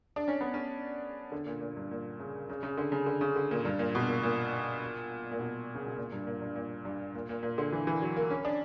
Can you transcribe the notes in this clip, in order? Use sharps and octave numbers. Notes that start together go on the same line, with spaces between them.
D4
C#4
B3
C#4
D3
A#2
A#2
G2
A#2
C#3
C#3
C#3
D3
C#3
D3
C#3
D3
A#2
G2
A#2
B2
A#2
A#2
A#2
B2
C#3
B2
A#2
G2
A#2
G2
A#2
G2
A#2
A#2
A#2
D3
E3
E3
F#3
A#3
C#4
D4